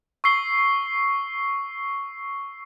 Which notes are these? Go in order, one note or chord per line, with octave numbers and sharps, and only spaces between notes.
C#6 E6 C7 G7